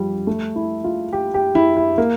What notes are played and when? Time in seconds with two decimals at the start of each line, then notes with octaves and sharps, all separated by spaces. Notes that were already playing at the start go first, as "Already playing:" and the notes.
Already playing: F3 G3
0.27 A3
0.56 E4
0.84 F4
1.13 G4
1.34 G4
1.55 E4
1.77 E4
1.98 A#3